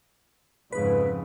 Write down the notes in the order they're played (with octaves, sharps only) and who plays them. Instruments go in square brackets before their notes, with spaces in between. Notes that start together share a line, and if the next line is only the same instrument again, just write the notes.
[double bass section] F2 G#2 C#3 [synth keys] B4